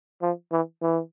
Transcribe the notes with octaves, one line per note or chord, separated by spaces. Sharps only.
F3
E3
E3